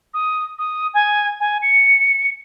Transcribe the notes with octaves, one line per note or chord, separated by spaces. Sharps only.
D#6
D#6
G#5
G#5
C#7